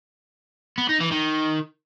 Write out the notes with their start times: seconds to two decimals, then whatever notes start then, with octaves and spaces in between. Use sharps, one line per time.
0.78 B3
0.89 D#4
1.00 E3
1.11 D#3